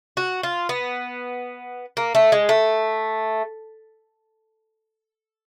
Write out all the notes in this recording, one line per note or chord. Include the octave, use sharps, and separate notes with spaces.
F#4
F4
B3
A#3
A3
G#3
A3